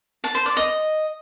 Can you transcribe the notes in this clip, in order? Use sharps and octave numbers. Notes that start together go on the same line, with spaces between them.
A5
C5
D5
D#5